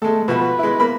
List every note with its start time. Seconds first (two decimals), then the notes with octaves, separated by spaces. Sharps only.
0.02 G#3 A3 A4
0.28 B2 F3 F#4 B4
0.59 G#3 E4
0.80 A#3 A#4 B5